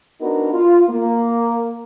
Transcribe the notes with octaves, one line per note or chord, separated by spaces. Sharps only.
B3 D4 D#4 F#4 A#4
F4
A#3